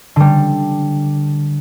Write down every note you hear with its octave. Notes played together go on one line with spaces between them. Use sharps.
D3 G3